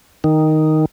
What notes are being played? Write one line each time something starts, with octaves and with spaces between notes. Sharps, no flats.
D#3